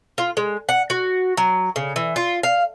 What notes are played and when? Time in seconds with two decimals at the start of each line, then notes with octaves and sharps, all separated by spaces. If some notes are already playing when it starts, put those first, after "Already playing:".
0.18 F4
0.37 G#3
0.69 F#5
0.90 F#4
1.37 F#3
1.76 C#3
1.96 E3
2.16 F4
2.43 F5